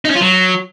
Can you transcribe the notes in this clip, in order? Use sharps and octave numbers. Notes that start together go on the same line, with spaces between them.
D#4
C#4
F4
F#3